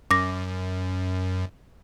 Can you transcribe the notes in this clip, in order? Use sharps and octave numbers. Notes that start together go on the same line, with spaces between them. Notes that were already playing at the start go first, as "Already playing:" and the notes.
F#2 D6 A#6